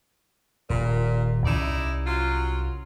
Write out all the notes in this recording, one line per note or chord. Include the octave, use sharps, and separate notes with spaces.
D#1 A#2
C2 C#4 D#4 E4 D5
F#3 F4